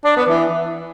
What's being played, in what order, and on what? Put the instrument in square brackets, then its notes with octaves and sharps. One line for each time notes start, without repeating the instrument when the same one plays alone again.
[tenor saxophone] D4
B3
E3